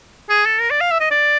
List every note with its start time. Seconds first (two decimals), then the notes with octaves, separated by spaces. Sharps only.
0.30 G#4
0.46 A4
0.60 A#4
0.71 D5
0.81 F5
0.91 E5
1.01 D#5
1.11 D5